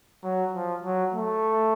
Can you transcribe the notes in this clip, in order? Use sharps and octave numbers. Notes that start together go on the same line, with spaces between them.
F#3
F3
F#3
A3